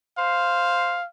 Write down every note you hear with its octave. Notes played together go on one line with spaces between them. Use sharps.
C5 F5